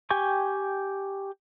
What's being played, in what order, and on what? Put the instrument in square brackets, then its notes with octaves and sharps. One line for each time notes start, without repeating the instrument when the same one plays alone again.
[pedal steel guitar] G4 G5 G#5 C#6